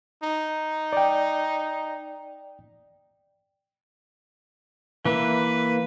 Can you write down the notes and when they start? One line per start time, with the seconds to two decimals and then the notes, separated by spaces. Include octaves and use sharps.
0.23 D#4
0.93 D5 G5
5.05 E3 A#3 B4 E5